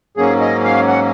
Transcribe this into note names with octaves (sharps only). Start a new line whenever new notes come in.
G#2 F#3 A#3 C#4 G#4
D#5
F5
F#5